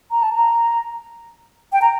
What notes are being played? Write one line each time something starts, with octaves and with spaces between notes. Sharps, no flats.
A#5
A5
A#5
G5
A#5